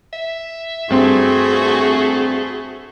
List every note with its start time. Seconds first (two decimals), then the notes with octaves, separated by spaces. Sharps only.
0.13 E5
0.90 G2 A3 C4 F#4 G#4 C6